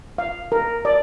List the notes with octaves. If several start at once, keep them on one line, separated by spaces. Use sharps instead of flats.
F5
A#4
D5